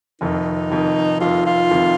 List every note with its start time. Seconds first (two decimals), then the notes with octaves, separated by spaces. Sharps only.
0.21 F1 F2 D#3 D#4
0.71 F1 F2 D#3
1.21 F1 F2 D#3 F4
1.46 F4
1.71 F1 F2 D#3